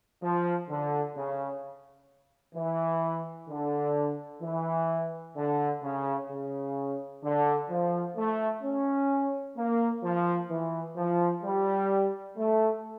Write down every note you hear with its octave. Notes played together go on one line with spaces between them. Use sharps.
F3
D3
C#3
E3
D3
E3
D3
C#3
C#3
D3
F3
A3
C#4
A#3
F3
E3
F3
G3
A3